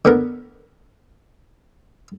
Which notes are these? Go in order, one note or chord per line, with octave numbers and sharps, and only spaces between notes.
D3 B3 A#4